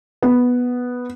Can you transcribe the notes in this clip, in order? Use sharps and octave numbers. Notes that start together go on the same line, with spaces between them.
B3